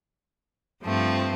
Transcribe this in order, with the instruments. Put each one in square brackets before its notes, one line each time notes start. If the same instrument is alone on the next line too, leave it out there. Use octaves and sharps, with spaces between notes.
[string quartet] G2 F3 A3 C4